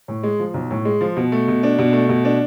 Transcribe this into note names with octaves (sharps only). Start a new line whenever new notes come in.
A2
G#3
F3
B1
A2
G#3
F3
B2
A3
B2
D4
B2
A3
B2
D4